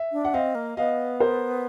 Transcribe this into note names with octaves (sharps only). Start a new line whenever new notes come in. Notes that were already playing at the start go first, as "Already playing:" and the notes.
Already playing: E5
D4
F#5
C4 D#5 F5
A#3
B3 D#5 F5
A#4 C5